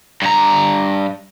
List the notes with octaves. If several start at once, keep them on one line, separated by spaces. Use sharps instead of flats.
G2 A#5